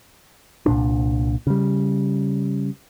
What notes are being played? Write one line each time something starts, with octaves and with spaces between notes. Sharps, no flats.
C2 A#2 D4
C#3 G3